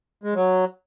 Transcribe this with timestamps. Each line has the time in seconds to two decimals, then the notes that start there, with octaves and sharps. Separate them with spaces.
0.23 G#3
0.35 F#3